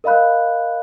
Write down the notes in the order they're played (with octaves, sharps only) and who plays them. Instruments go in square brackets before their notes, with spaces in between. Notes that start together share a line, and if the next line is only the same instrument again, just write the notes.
[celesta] A#4 D#5 F5 B5 F#6